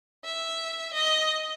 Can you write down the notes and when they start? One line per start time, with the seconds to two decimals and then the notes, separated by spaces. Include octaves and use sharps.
0.25 E5
0.94 D#5